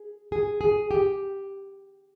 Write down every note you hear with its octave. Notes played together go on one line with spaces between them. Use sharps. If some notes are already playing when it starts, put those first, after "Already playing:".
Already playing: G#4
G#4
G#4
G4